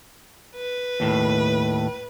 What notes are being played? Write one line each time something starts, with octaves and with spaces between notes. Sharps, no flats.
B4
D#2 A2